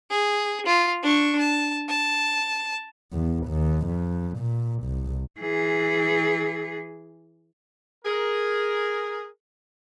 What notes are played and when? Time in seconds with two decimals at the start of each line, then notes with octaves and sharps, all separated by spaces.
0.11 G#4
0.66 F4
1.03 D4 C#6
1.38 A5
1.89 A5
3.13 E2
3.47 D#2
3.86 F2
4.39 A#2
4.84 C2
5.40 E3 G#4
8.05 G#4 A#4